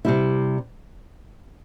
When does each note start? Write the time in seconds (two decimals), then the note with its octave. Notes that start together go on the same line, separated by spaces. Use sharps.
0.05 C3 G3 E4